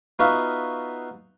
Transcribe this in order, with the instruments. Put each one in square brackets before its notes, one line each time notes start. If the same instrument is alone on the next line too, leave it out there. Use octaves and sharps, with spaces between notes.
[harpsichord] B3 D#4 F4 F#4 E5 F5